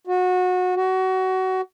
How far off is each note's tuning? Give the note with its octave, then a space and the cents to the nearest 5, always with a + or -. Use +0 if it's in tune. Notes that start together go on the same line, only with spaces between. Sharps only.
F#4 -25
F#4 +20